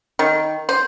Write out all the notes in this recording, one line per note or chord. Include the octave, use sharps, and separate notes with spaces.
D#3
C5